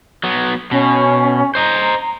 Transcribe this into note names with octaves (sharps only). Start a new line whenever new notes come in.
F#3 B3
B2 C#4
C5 D#5 A#5